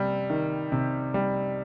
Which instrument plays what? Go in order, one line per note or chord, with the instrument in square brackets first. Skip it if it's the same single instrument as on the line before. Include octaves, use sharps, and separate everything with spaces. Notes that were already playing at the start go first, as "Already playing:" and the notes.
Already playing: [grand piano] C3 G3
D#3
C3
G3